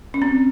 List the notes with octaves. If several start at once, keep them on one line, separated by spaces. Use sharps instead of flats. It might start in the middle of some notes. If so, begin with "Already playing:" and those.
C#4
C4